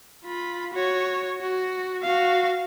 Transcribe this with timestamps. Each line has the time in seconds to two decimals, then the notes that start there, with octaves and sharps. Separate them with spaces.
0.25 F4 B5
0.74 F#4 C#5
1.41 F#4
2.03 F#4 F5